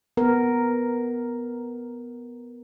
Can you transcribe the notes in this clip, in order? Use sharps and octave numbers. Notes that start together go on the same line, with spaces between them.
B3 A#4